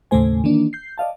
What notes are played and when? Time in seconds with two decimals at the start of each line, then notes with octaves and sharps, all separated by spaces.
0.11 D#2 A2 C#3 A3 C5 G#5
0.44 D#3 E3 A#3 D4
0.73 G6 C7
0.98 D5 D#5 F5 A5